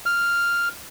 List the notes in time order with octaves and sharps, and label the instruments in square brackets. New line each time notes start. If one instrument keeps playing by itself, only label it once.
[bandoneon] F6